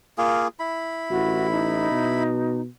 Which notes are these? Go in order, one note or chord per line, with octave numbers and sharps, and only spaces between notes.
A#3 F4 G#4
E4 B5
A1 F#4
D#4
B2